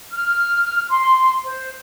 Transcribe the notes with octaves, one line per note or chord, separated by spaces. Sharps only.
F6
C6
C5